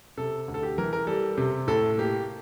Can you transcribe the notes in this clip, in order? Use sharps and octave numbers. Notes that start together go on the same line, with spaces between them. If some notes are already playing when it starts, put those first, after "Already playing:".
C3 A4
D2
A4
G4
E3 A#4
A#4
G3 A4
C3
A2 A4
A#3 G4